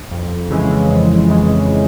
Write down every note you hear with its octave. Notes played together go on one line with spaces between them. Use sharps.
F2
C#3 E3 G#3
F2
C#3 E3 G#3